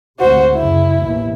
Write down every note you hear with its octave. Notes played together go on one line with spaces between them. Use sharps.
D2 G#2 C3 F#4 C5
F#2 C#3 E4
A1 D#2 B2